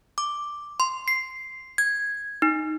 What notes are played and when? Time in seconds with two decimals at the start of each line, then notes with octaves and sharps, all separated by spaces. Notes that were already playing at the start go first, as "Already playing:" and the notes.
0.18 D6
0.80 C6
1.08 C7
1.78 G#6
2.42 D#4